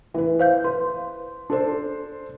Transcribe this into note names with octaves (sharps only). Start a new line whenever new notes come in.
E3 B4
C5 F5 G6
B4 C6
D4 A4 C5